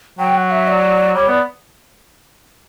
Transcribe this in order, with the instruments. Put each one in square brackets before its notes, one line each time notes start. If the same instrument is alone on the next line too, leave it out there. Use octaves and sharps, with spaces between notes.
[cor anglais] F#3 [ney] G5
[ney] F#5
E5
D5
[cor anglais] G3 [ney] C#5
[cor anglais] B3 [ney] D5